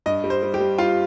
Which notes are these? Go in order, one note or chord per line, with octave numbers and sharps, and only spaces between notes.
G2 D#5
G3
C5
G3
G4
G3
G3 F4